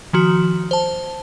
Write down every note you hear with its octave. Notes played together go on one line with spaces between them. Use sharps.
D#3 F3 F#4
C5 A5